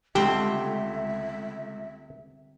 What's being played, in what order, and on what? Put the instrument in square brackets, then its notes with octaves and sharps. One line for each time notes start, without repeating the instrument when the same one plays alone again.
[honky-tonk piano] C#2 A3 [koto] D3 G3 C4 [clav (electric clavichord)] G4 [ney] E5